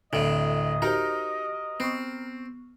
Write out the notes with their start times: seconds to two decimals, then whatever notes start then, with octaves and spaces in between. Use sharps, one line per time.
0.13 D1 A2 D3 D#5
0.82 D#4 F#4 G4 A#4 C5
1.80 B3 C4 C#6